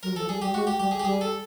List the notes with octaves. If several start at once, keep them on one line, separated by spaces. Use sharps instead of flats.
F#3 A#4
F3 A4
G3 G#4
G3 G4
G#3 F#4
G4
G3 G4
G#4
G4
G3 G#4
A4